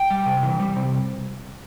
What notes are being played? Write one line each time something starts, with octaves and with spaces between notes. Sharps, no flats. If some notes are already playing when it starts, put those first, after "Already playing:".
Already playing: G5
G3
C3
E3
G3
C3